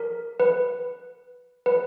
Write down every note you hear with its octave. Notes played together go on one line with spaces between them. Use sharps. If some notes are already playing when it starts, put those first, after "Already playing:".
Already playing: A#4
B4
B4